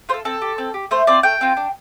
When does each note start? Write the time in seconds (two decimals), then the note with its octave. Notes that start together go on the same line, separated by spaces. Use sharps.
0.09 F4 C5
0.14 A4
0.25 C4 A4
0.42 G4
0.58 C4
0.74 G4
0.91 A3 C5
1.07 C4 F4 D5
1.23 A3 G5
1.41 C4 F4
1.57 D4